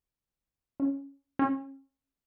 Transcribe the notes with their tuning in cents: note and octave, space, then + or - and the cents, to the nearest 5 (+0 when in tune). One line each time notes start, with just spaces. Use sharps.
C#4 -5
C#4 -40